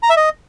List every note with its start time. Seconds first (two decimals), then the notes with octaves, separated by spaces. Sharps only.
0.03 A#5
0.10 E5
0.17 D#5